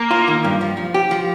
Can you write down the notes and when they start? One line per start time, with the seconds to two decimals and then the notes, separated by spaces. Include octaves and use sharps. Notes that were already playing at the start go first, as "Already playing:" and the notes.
Already playing: A#3
0.11 F4
0.28 D#3
0.44 G2
0.61 F3
0.77 F3
0.94 G4
1.11 F3